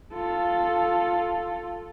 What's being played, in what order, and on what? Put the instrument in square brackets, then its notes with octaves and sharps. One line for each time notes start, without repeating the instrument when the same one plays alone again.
[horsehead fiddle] F4 A4